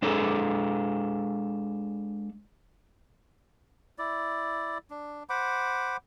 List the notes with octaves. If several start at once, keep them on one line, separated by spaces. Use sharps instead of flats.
G#3 D4 G#4 A4
E4 D5
D4
C5 F#5 B5 D6